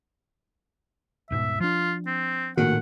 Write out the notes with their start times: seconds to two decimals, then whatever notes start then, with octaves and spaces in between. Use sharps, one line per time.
1.31 D#1 G#2 B2 E5
1.60 F3 D4 F4
2.07 C4
2.57 A#1 A2 D#3 F#4 F#5